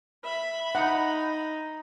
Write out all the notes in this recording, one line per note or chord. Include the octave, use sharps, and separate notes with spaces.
E5 B5
D#4 F#5